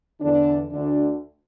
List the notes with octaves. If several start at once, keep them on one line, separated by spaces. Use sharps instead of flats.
E2 D3 D4
D2 D3 D4